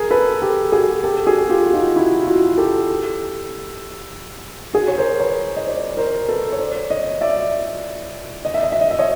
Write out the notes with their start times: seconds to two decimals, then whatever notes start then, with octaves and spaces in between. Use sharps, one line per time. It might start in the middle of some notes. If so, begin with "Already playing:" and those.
Already playing: G#4 A#4
0.11 A4 B4
0.42 G4 A4
0.72 F#4 G#4
1.04 G4 A4
1.27 F#4 G#4
1.50 F4 G4
1.66 F#4
1.73 D#4 F4
1.96 E4 F#4
2.22 F4
2.27 E4 F#4
2.58 G4 A4
4.74 F#4 G#4
4.88 C#5
4.97 A#4 C5
5.20 B4 C#5
5.56 D#5
5.67 C5 D5
5.97 A#4 C5
6.29 A4 B4
6.53 C#5
6.59 C5 D5
6.90 C#5 D#5
7.21 D5 E5
8.45 D#5
8.54 E5
8.63 D#5
8.72 E5
8.81 D#5
8.91 E5
8.99 C#5 D#5